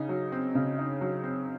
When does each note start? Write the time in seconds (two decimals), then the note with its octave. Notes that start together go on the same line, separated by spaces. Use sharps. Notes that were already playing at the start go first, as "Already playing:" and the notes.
Already playing: C#3 D#4
0.09 F#3
0.32 C4
0.55 C#3
0.78 D#4
1.01 F#3
1.23 C4